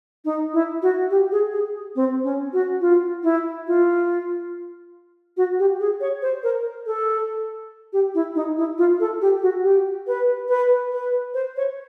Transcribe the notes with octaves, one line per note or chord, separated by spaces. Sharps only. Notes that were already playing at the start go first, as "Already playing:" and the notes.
D#4
E4
F#4
G4
G#4
G#4
C4
C#4
F#4
F4
E4
F4
F#4
G4
G#4
C#5
C5
A#4
A4
G4
E4
D#4
E4
F4
A4
G4
F#4
G4
B4
B4
B4
C5
C#5